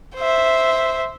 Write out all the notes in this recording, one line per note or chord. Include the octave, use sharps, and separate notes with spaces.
C5 E5